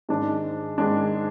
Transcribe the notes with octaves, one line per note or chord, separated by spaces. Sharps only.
G#2 D#3 G#3 D4
G#2 D#3 G#3 D4